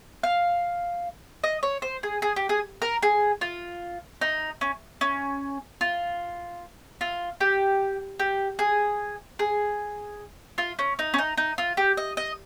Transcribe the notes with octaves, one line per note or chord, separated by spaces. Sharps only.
F5
D#5
C#5
C5
G#4
G#4
G4
G#4
A#4
G#4
F4
D#4
C#4
C#4
F4
F4
G4
G4
G#4
G#4
F4
C#4
D#4
C#4
D#4
D#4
F4
G4
D#5
D#5